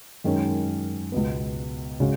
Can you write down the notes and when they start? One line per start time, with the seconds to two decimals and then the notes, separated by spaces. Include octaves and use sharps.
0.24 F#2 D#3 G#3 C#4
1.12 C#2 B2 B3
2.00 C#3 G#3 C#4 F#4